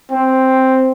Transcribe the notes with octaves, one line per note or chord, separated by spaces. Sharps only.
C4